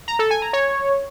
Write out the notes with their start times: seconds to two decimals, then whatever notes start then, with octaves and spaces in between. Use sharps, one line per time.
0.08 A#5
0.19 A4
0.31 G#5
0.42 A#5
0.53 C#5